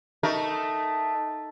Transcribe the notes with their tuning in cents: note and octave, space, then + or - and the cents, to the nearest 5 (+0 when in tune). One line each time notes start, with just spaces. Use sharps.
A3 +0 D#4 +0 A#4 +15